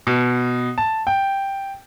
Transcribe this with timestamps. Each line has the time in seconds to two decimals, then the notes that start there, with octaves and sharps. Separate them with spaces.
0.07 B2
0.78 A5
1.07 G5